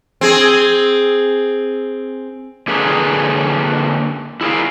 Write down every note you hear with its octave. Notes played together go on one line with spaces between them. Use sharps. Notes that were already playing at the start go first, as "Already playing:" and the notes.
C4 G#4
D3 A#3 C#4 G#4 B4
E4 G#4 A#4 F5